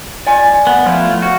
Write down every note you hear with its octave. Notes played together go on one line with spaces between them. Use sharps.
D5 G#5
B3
F3 A3 E4 F4
F#4